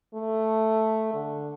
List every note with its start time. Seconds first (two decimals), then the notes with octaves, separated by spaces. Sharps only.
0.15 A3
1.14 D3